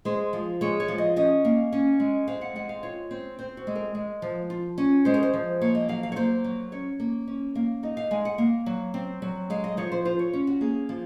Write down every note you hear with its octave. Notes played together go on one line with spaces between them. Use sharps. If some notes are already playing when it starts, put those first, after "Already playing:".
G#3 C5
F3
G#3 C#5
C#5
F3
D#5
C#4 D#5
A#3
C#4
G#3
C4 F5
F#5
G#3 F#5
F5
F4 C#5
C4
C4 C5
F#4
G#3
A#4
G#3
F3
F4
C#4
G#3 C5
A#4
C5
F3
A#3 C#5
D#5
F#3 F5
F5
C#5
A#3 C5
F#3
C#4 C#5
A#3
C#4
A#3
D#4 D#5
F5
G#3 G#5
F#5
A#3
F#3
C4
F#3
G#3 F5
D#5
F3 C#5
C5
F4 C5
C#5
C#4
F#4
A#3 G#4
F3